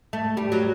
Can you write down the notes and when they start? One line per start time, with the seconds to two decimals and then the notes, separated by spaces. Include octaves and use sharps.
0.13 A3
0.37 G3
0.52 F#3